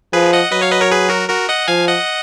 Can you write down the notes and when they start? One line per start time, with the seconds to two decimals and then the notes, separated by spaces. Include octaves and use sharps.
0.13 F3 G#4 B4
0.33 D#5 F#5
0.52 F#3 B4 D#5
0.61 C#5 F5
0.71 B4 D#5
0.81 A#4 C#5
0.90 G#4 B4
1.10 F#4 A#4
1.29 F#4 A#4
1.49 D#5 F#5
1.68 F3 F5 G#5
1.88 D#5 F#5